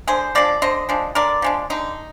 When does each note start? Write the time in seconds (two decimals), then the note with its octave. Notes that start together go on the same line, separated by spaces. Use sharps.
0.07 D3 G#4 C5
0.35 F3 G#3 D4 D5
0.62 D3 C5 D#5
0.89 F3 G#3 D4
1.15 D3 A#4 D5
1.42 F3 G#3 D4
1.70 D3 D#4